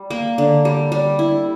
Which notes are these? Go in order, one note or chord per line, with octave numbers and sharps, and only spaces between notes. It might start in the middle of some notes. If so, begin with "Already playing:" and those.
Already playing: G3
A#3
D3
G3
G3
E4